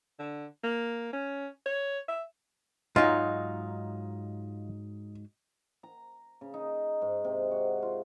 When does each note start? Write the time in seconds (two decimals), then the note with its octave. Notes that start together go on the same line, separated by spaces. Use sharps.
0.19 D3
0.64 A#3
1.13 C#4
1.66 C#5
2.08 E5
2.96 G#2 F#3 D#4 F4 D#5
5.83 A#5
6.41 C#3
6.54 D#4
7.02 G#2
7.24 C3
7.51 F#4
7.82 F4